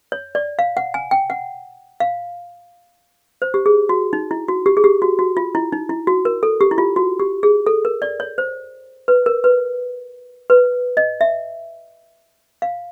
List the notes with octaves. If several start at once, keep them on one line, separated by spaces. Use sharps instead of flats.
C#5
D5
F5
F#5
G#5
G5
F#5
F5
C5
G4
G#4
F#4
D#4
E4
F#4
G4
G#4
G4
F#4
F#4
F4
E4
D#4
E4
F#4
A#4
A4
G4
E4
F4
F#4
G4
G#4
A4
A#4
D5
C#5
C5
B4
A#4
B4
B4
D#5
E5
F5